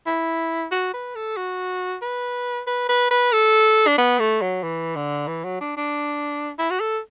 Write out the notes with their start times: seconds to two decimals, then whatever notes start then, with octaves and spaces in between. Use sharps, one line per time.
0.06 E4
0.72 F#4
0.94 B4
1.15 A4
1.37 F#4
2.02 B4
2.67 B4
2.89 B4
3.11 B4
3.32 A4
3.87 D4
3.98 B3
4.19 A3
4.42 F#3
4.63 E3
4.96 D3
5.28 E3
5.44 F#3
5.61 D4
5.77 D4
6.59 E4
6.70 F#4
6.80 A4